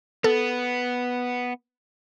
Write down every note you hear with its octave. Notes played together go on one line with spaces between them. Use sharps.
B3 A4